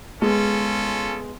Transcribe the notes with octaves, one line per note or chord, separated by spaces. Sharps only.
G#3 B3 C#4 F4 A4